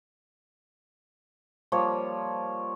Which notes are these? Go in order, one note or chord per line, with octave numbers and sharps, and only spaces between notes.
F3 G3 A#3 C#5